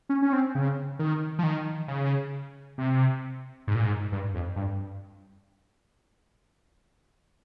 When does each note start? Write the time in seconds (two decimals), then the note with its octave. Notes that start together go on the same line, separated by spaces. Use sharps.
0.09 C#4
0.22 C#4
0.33 C4
0.55 C#3
0.99 D#3
1.39 F3
1.43 D#3
1.88 C#3
2.78 C3
3.67 G#2
3.75 A#2
3.82 G#2
4.12 G2
4.34 F2
4.56 G2